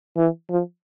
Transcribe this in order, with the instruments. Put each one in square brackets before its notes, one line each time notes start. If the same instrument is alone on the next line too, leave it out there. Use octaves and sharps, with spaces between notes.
[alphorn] E3
F3